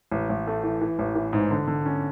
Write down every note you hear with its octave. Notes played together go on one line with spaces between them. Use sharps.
A1
A1
A3
E3
E3
A1
E3
G#2
D3
D3
C#4